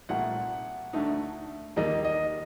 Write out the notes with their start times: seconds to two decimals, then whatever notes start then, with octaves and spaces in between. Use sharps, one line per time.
0.09 C2 A#2 A3 D#4 F#5
0.93 D2 D3 A3 D#4
1.76 D#2 D#3 G3 A#3 D#5
2.05 D#5